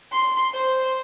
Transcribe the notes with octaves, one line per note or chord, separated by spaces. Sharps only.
C6
C5